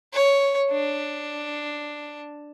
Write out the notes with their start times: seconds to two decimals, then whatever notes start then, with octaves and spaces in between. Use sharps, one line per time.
0.13 C#5
0.71 D4